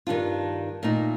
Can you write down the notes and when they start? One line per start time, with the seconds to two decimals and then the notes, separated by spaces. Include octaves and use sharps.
0.07 G2 D#3 G3 D4 F4
0.83 A#2 A3 D#4